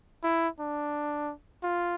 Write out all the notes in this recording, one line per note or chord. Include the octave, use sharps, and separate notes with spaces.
E4
D4
F4